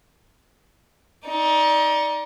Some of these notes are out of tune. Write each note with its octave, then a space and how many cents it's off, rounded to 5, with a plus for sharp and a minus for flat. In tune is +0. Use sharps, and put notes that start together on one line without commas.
D#4 +25 D5 +0